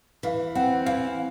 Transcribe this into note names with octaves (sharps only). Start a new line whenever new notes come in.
E3 F5
C4 F#5
E3 F5